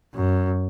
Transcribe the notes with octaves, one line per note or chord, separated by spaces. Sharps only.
F#2